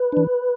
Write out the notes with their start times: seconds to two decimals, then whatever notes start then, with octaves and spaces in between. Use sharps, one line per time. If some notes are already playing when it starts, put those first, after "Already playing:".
Already playing: B4
0.12 E3 D4